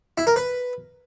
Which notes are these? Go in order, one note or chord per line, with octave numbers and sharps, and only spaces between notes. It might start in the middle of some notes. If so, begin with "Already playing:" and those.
E4
A#4
B4